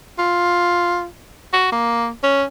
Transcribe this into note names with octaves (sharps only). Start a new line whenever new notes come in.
F4
F#4
A#3
C#4